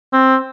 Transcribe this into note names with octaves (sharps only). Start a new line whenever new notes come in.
C4